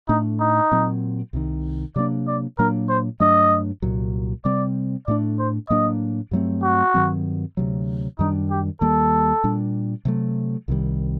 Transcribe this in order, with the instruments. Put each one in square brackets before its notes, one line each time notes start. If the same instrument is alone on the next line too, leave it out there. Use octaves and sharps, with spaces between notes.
[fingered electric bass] A2 A3 D4 [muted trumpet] D#4
[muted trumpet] D#4
[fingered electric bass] A#2 F#3 C4
C2 C3 D#3
[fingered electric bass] C3 F#3 A#3 D4 [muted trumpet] D5
[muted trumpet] D5
[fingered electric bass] A#2 F#3 A#3 D4 [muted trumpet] A#4
[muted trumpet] C5
[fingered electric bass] G2 F#3 A3 D4 [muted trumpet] D#5
[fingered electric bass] C2 A#2 F#3
[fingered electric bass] C3 G3 C4 [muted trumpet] D5
[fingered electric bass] A2 A3 D4 [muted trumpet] D5
[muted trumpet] C5
[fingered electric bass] A2 F#3 A#3 D4 [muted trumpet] D#5
[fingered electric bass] G2 F#3 A3 C4
[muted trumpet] F#4
[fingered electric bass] G2 D#3 F#3 C4
D2 C3 F#3
[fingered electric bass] F#2 D#3 G3 D4 [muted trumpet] D#4
[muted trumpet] G4
[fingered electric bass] D#2 D#3 G3 A#3 [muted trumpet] A4
[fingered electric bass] A#2 G3 D4
C3 F#3 A3
C2 C3 D#3 G3